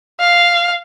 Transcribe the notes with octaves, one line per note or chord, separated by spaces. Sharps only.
F5